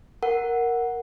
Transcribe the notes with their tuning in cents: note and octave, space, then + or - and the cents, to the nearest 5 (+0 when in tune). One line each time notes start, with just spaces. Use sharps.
A#4 +0 F#5 +0